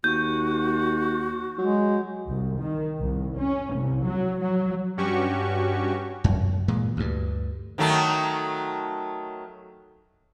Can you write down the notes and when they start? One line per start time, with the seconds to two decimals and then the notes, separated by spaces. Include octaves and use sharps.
0.04 D#2 F#4 G6
1.58 F#3 G#3
2.27 C2
2.59 D#3
2.98 C2
3.38 C#4
3.75 C2
4.04 F#3
4.41 F#3
4.97 G2 C#4 F#4 G4 C#6
6.24 F#2
6.68 A#2 E3 G#3
6.97 D2 G2
7.78 D#3 F#3 A3